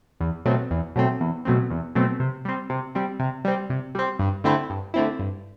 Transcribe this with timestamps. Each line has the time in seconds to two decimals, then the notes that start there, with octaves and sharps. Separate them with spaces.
0.20 E2
0.45 B2 F#3 A3 C4
0.71 E2
0.96 B2 F#3 A3 C4
1.21 E2
1.45 B2 F#3 A3 C4
1.70 E2
1.95 B2 F#3 A3 C4
2.20 C3
2.45 G3 C4
2.70 C3
2.95 G3 C4
3.20 C3
3.45 G3 C4
3.70 C3
3.95 G3 C4
4.19 G2
4.44 D3 A3 C4 E4
4.70 G2
4.94 D3 A3 C4 E4
5.19 G2